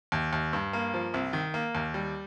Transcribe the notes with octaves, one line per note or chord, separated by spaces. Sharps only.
D#2
D#2
G2
A#3
F3
C2
D#3
A#3
D#2
G3